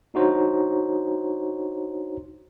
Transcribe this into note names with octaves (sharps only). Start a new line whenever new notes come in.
D4 D#4 F#4 C5 C#5 A#5